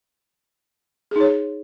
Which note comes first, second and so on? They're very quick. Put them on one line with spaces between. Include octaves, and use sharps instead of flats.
G#4 D#4 C#5